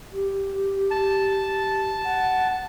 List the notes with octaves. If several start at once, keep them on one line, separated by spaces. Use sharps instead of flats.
G4
A5
F#5